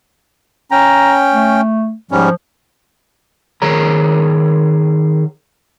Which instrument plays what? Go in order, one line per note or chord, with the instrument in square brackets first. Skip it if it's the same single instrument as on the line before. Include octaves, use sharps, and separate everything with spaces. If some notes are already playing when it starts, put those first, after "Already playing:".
[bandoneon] C#4 G5 [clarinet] A#5
[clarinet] A3
[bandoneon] G#2 G3 C#4 [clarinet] F3
[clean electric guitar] D#3 G#4 A#4 C#5 A#5